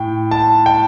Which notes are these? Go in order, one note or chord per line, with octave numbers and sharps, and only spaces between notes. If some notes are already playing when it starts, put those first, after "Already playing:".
Already playing: A2 G5
A5
G5